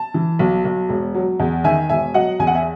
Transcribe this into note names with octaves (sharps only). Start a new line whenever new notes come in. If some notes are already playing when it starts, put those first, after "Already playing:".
Already playing: A5
E3
B1
B1
E1
F#3
E2
D#3 E5 G#5
E1 E5 G#5
F#3 D#5 F#5
E2 G#5
F#5
E5 G#5